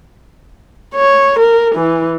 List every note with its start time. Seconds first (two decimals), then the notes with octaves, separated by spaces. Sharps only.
0.95 C#5
1.39 A#4
1.75 E3